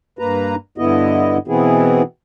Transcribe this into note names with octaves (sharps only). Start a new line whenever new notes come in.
G2 A#3 B4 A#5
G2 D3 B3 E4 D#5
B2 E3 B3 C4 E4 G#4